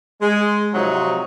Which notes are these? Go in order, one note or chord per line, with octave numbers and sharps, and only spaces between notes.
G#3
G#2 C3 F3 F#3 D#4